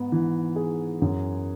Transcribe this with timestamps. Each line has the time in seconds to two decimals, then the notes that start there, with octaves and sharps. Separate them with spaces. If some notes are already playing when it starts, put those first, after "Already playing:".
Already playing: G#2 B3
0.12 E3
0.56 G#4
1.02 F#2